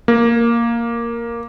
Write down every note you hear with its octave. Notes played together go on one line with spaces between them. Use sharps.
A#3